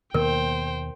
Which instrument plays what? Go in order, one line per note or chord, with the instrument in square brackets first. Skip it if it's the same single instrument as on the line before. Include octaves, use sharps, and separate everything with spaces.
[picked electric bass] D#2 [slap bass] B2 D#3 A#3 [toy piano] A#4 [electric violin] C5 G5